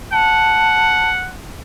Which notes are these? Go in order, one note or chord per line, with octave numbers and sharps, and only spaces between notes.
F#5 A5